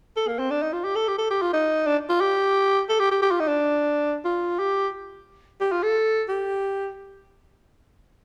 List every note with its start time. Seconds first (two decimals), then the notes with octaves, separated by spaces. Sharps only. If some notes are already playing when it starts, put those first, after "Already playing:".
0.17 A4
0.28 A#3
0.39 C4
0.51 D4
0.62 D#4
0.73 F4
0.84 G4
0.96 A4
1.08 G4
1.18 A4
1.31 G4
1.42 F4
1.53 D#4
1.87 D4
2.09 F4
2.21 G4
2.89 A4
2.99 G4
3.11 G4
3.22 G4
3.31 F4
3.40 D#4
3.48 D4
4.25 F4
4.59 G4
5.61 G4
5.72 F4
5.83 A4
6.29 G4